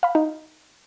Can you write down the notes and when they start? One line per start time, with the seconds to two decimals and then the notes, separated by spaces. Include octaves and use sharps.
0.03 F5 B5
0.15 D#4